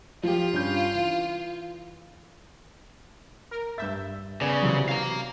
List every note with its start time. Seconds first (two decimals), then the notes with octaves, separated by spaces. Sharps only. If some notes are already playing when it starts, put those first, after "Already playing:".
0.23 F3 F4 G4
0.53 G2 C#4 G6
0.95 E3
3.51 A#4
3.78 G2 E5 G6 A6
4.41 C#3 B3 D5 G#5
4.62 C3 E3 F#3
4.89 F5 A#5